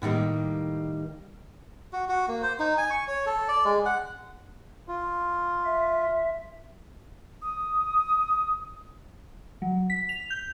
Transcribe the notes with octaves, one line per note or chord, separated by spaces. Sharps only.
A2 D#3 G3 A#3
F#4
F#4
A#3
C5
D#4
G#5
C#6
C#5
A4
D5
G#3
F#5
F4
E5
D#6
F#3
B6
F7
G6